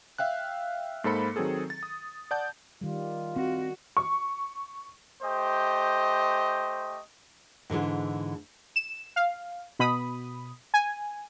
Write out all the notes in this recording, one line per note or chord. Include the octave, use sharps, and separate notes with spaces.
E5 F5 G5 F#6
G#2 A#3 A4 C5 B5 C#7
D#3 F#3 C4 G#4 A4
A6
D#6
D5 F#5 A5 G6
D#3 G3 F4
C4 F#4
C#6
A3 G4 C5 D#5
G#2 D3 E3 G#3
E7
F5
B2 B5 D#6
G#5